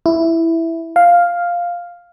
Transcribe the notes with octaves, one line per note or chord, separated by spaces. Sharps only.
E4
F5